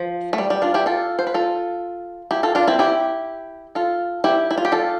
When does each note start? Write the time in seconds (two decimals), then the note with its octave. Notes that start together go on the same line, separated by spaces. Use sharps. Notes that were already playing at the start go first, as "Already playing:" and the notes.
Already playing: F3
0.33 A3
0.38 G3
0.50 G3
0.62 D4 F4
0.74 E4 G4
0.86 F4 A4
1.19 C5
1.27 B4
1.34 F4 A4
2.31 E4 G4
2.43 F4 A4
2.55 D4 F4
2.67 C4 E4
2.79 E4 G4
3.75 F4 A4
4.24 E4 G4
4.51 E4
4.58 F4
4.65 G4
4.72 F4 A4